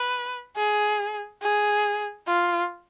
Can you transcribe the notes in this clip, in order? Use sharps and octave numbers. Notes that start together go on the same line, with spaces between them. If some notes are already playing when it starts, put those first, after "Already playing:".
Already playing: B4
G#4
G#4
F4